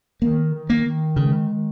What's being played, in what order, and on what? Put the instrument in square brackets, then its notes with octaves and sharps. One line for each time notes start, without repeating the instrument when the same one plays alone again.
[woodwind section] D#3 [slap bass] A#3
[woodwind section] D#3
[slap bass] A#3
[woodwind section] D#3
[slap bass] C#3 [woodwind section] G#3
[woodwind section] D#3